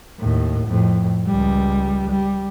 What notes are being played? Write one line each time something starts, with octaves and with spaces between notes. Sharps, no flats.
D#2 A2
F2 A2
C#2 G3
G3